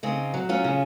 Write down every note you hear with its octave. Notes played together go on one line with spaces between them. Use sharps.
C#3 C4 D#4
F#3
C#4 F4
C#3